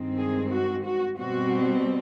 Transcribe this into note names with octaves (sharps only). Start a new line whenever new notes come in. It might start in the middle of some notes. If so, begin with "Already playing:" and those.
Already playing: G2 D#3 G#3 C4
G#4
F#4
F#4
B2 G3 C4 F#4